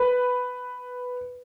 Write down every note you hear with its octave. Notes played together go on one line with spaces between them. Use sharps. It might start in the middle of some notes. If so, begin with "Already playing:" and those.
Already playing: B4